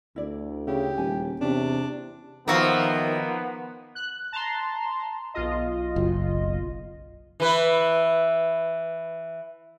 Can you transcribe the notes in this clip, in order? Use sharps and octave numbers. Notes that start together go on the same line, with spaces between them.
D2 E4 D5
C#3 E4 G4
D#1 G#5
E2 C3 C#4 D4
D#3 F3 A#3 B3 F4 F#4 E5
F#6
A5 A#5 C6
B1 F4 D#5
F#1
E3 B4